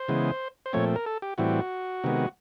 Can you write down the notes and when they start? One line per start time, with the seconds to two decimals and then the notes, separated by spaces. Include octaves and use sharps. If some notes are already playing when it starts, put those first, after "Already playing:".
Already playing: C5
0.08 C#3 E3 G#3 B3
0.66 C5
0.73 A#2 F3 A3 C4 C#5
0.96 A#4
1.06 A4
1.22 G4
1.38 A2 E3 G3 C4 F#4
2.04 C3 D#3 G#3 B3